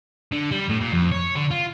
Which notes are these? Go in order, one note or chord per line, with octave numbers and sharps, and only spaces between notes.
D3
G3
A2
A#2
F2
C#5
D3
F4